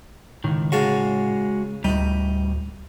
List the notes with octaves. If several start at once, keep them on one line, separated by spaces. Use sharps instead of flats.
C#2 A2 D#3
C#3 G#3 F#4 F5 A5
D2 A2 G3 D#4